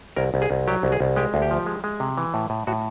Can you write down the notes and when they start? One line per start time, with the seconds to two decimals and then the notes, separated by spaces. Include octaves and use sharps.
0.16 C2 A#4
0.34 C2
0.42 G#4
0.51 C2
0.68 F#3 G4
0.83 C2
0.92 G#4
1.01 C2
1.16 G#3 G4
1.34 D2
1.42 G4
1.51 F3
1.66 G#3
1.84 G#3
2.00 C3
2.17 E3
2.34 A2
2.50 A2
2.67 A2 F#4